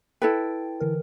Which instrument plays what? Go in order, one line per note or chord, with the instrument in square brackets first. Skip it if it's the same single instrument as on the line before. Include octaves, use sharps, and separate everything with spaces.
[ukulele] E4 A4 B4 [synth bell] G5
[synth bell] D3 E3 A#4